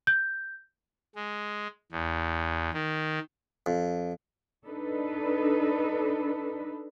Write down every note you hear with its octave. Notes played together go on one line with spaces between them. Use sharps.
G6
G#3
E2
D#3
F2
D4 D#4 A4 B4